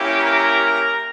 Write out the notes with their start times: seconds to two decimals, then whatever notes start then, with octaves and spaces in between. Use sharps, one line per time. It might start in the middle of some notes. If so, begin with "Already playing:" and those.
Already playing: A#3 C#4 E4 G4
0.20 A#4 A#5